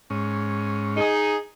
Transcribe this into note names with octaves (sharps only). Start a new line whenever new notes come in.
G#2 C#4
D#4 G#4